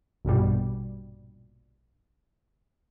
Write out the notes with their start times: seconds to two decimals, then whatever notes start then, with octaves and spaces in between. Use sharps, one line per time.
0.25 A#1 G2 B2 G3